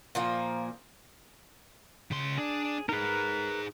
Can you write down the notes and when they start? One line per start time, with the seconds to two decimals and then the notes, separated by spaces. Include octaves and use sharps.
0.15 A#2 F3 A#3
2.11 C#3 C6
2.38 D4 G#4
2.89 D#4 G#4 A#4 B4